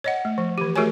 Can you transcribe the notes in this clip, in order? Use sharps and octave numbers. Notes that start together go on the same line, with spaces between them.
C#5 D#5 F#5
A3
F3
E3 G4
A3 F#4 G#4 A#4 C#5 G#5